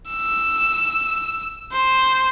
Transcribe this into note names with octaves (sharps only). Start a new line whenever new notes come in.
E6
C5